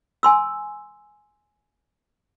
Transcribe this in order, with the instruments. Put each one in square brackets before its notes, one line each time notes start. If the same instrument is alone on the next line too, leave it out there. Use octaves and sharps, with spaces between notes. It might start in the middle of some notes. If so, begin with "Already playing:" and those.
[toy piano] G#5 C6 E6